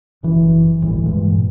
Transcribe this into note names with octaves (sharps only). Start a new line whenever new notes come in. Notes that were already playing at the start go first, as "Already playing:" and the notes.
F#1 E3
G1 D2 A2 E3
G2 A#2 G#3